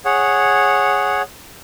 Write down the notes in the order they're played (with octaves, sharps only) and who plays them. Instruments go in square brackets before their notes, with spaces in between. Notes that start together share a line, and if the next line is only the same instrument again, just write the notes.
[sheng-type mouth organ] G#4 C#5 F#5